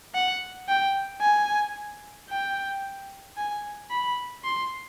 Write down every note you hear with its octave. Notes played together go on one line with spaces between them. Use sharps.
F#5
G5
G#5
G5
G#5
B5
C6